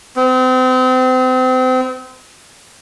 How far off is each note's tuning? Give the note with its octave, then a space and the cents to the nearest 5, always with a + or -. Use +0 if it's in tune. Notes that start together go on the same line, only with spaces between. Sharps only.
C4 -35